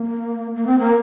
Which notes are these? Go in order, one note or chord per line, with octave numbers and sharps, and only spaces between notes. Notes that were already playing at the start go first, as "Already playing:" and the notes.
Already playing: A#3
A#3
C4
A#3